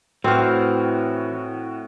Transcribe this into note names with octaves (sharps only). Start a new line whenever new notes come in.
A2 E3 C4 F#4 F6